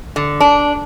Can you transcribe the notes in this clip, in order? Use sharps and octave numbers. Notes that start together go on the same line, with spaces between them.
D3
D4